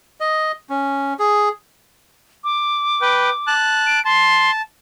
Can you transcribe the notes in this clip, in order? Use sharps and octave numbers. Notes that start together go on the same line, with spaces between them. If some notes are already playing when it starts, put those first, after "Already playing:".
D#5
C#4
G#4
D6
B4 G5
A5 F#6
D7
A5 C6